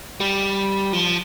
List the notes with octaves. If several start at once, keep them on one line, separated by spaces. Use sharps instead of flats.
G3
F3